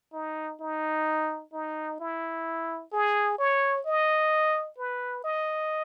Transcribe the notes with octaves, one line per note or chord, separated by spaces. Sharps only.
D#4
D#4
D#4
E4
G#4
C#5
D#5
B4
D#5